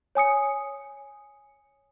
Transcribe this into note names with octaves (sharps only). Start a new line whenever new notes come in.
C#5 G#5 D#6 C#7